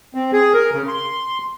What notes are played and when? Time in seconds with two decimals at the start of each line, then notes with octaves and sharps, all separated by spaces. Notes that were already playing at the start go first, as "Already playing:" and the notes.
0.15 C4
0.33 G#4
0.53 A#4
0.73 C#3
0.88 C6